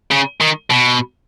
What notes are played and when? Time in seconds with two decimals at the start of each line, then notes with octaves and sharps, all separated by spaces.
0.11 C#3
0.40 D#3
0.70 B2